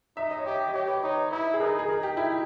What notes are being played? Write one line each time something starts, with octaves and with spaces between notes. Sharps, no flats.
D#4 E5
D#5
C#5
G4 D#5
D#5
G4 C#5
B4
D#4 C#5
E4 B4
G#4
D#4 A#4
G#4
D#4 A#4
G4
E4